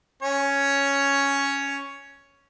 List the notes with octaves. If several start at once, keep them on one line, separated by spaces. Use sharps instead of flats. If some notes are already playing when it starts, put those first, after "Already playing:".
C#4 C#5